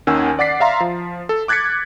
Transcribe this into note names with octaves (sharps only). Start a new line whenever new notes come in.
D#2 D#3 C#4 F#5 G#5 E6
D5 F#5 D6 A6 B6 C7
E5 F5 A#5 C6
F3
A4
D6 F#6 G#6 A6 B6 C#7